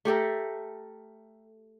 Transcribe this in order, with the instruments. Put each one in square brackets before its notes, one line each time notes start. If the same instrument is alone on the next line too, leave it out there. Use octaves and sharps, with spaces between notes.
[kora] A3 G4 A4 A#4